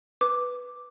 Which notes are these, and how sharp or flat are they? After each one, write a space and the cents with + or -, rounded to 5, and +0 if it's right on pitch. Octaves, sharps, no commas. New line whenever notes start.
B4 +0 D6 +0